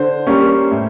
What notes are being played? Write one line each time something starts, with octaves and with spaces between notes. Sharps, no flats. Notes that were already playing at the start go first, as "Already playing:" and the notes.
Already playing: D3 C5
G3 A#3 C#4
A2